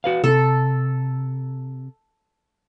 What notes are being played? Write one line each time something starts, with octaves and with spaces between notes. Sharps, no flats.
F#4 B4 F5
C3 A4